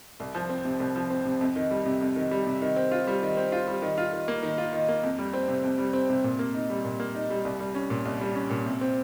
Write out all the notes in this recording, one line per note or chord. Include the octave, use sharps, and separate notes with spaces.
C2
F3
C4
C3
C2
F3
C4
C3
F2
D#3
G3
C3
F2
D#3
G3
C3
D#3
C4
F4
G3
D#3
C4
F4
G3
D#3
F4
D#3
A#3
D#3
F4
D#3
A#3
F2
G3
C4
C3
F2
G3
C4
C3
A#2
A#3
D#4
G3
A#2
A#3
D#4
G3
C2
G3
C#4
A#2
C2
G3
C#4
A#2
C3
C4